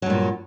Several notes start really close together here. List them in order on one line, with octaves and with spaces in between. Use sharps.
F#3 G2 A#2